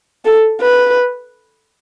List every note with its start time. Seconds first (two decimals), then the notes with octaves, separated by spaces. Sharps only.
0.25 A4
0.62 B4